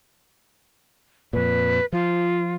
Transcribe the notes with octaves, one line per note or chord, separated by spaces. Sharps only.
F2 A#2 B4
F3 F4